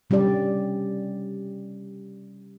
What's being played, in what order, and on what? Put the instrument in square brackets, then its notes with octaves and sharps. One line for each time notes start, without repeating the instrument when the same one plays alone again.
[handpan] C3 G3 C#4 G4 D5